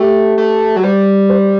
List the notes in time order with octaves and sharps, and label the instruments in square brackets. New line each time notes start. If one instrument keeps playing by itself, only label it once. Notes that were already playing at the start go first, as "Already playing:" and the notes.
Already playing: [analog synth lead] A3 [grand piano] G4
[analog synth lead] A3
F#3
[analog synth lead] G3 [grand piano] C5
[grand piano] C5